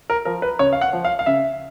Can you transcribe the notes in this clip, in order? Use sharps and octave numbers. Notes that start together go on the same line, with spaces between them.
A#4
F3 A#4
B4
C#3 C#5
F5
F#5
F3
F5
F5
C#3 E5